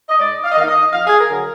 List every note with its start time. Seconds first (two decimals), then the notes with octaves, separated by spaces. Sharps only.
0.09 D#5
0.19 G#2 D5
0.44 F5
0.52 D#5
0.56 D#3 A#3 D#4 F5
0.68 D#5
0.93 F2 F5
1.07 G#4
1.18 A#4
1.30 D3 F#3